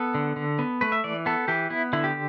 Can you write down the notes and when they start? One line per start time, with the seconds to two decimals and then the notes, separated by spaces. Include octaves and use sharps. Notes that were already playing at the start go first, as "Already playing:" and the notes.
Already playing: B3 A4
0.15 D3
0.36 D3
0.59 B3
0.81 A3 B4
0.92 E5
1.04 E3 D5
1.26 B3 A4
1.48 E3 G4
1.70 B3 E4
1.93 D3 E4
2.04 G4